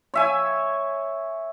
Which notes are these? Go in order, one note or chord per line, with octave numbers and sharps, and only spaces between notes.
C#5 E5 G#5